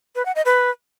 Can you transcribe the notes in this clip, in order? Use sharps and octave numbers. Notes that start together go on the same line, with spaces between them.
B4
F#5
D#5
B4